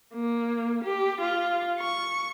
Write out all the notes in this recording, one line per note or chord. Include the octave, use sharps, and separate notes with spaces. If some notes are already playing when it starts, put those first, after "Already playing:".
A#3
G4
F4
C#6